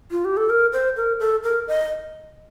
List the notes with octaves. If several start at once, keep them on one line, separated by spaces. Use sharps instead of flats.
F4
G4
A4
A#4
C5
A#4
A4
A#4
D#5